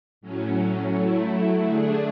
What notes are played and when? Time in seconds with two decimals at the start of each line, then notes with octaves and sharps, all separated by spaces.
0.21 A2 F#3 C#4
0.92 F#3 A3 E4
1.64 D3 A3 D4 G#4